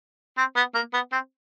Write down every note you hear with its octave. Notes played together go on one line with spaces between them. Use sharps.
C4
B3
A#3
B3
C4